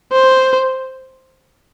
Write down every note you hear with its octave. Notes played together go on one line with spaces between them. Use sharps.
C5